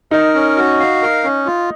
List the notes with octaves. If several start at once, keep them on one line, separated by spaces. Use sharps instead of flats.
D#4 A#4
C#4
F#4
F5
A#4
C#4
F4